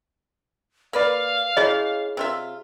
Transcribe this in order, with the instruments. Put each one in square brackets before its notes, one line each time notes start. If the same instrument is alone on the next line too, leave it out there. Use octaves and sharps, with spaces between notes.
[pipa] A#3 B4 D5 [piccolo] F5
[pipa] C#4 E4 [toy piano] G#4 C#5 D#5
[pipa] C3 F4 E5